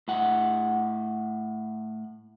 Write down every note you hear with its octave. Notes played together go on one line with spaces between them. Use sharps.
A2 F#5